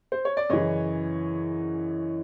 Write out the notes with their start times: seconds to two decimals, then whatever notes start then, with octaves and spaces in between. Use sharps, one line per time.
0.12 C5
0.25 C#5
0.37 D5
0.50 F#2 C#3 E3 C#5 D#5